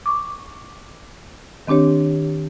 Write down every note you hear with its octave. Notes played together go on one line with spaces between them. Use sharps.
C#6 D6
D#3 C4 D4 G4 C#5